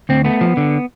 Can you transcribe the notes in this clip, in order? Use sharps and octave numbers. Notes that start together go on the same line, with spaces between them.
D2 C4
A3 B3
F3
D3